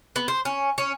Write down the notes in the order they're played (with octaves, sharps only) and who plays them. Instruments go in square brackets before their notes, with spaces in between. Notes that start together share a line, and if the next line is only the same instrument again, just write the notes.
[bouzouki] B3
C5
C#4
C#4